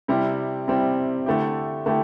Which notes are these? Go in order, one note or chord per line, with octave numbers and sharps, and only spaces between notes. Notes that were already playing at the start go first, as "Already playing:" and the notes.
C3 G3 C4 E4
C3 G3 C4 E4
D3 A3 E4 G4
D3 A3 E4 G4